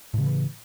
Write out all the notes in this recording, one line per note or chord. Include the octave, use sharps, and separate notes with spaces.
A2 C#3 E3 F3